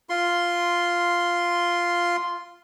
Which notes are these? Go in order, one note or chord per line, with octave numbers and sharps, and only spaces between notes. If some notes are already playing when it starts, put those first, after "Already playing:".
F4 C6